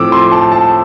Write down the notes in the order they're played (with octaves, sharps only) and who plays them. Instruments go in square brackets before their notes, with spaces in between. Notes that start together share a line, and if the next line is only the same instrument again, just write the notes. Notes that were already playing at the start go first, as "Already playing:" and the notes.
Already playing: [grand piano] A2 F3 A3 C4 D6 E6
C6
A5
A5